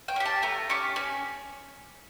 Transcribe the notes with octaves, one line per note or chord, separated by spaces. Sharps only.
G5
C#4 G4
A5
A3 A#5
C#4 G4 C#6
C#4